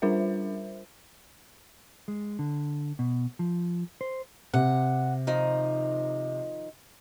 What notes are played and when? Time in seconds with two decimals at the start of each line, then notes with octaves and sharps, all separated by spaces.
0.02 G3 D4 F4 A#4 C5 E5
2.08 G#3
2.39 D3
2.99 B2
3.39 F3
4.01 C5
4.54 C3 F#5
5.27 D#3 F3 D#4